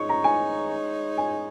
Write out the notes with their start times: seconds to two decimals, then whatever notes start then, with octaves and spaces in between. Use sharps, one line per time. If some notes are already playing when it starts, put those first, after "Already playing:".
Already playing: G#3 D#4 C#5 C#6
0.09 A#5
0.24 G#5
1.18 G#5